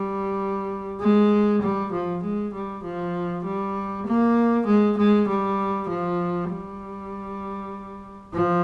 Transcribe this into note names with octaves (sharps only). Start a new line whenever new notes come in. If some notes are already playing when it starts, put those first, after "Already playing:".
Already playing: G3
G#3
G3
F3
G#3
G3
F3
G3
A#3
G#3
G#3
G3
F3
G3
F3